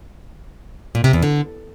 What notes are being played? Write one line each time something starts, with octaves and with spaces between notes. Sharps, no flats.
A#2
C3
E2
D3